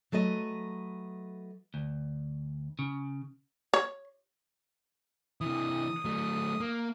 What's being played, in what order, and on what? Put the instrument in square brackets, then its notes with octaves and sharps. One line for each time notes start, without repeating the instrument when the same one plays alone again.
[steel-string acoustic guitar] F#3 A3 B4 D#5
[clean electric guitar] D2
C#3
[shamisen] C#5
[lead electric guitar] C3 E3 [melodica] D#6
[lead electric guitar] F#3 A3
A#3